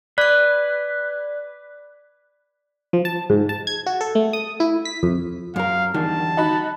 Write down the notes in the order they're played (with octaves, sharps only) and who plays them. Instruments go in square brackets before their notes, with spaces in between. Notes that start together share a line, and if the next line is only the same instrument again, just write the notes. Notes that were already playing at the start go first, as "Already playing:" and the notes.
[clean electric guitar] B4 [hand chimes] D5 F#6
[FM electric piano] F3
A5
G#2
A5
G#6
F#4
A4
A3
D#6
E4
B6
F2
[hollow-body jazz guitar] F#2 A#4 [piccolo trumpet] F5
[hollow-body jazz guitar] E2 D3 G3 [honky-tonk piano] D#3 [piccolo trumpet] A5
[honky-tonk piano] D#4 F#4 B5